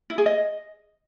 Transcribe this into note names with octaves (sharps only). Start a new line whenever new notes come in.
E4
G#4
D#5